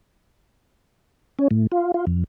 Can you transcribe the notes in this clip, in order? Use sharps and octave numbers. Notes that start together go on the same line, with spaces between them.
C#4
A2
F4
F4
F2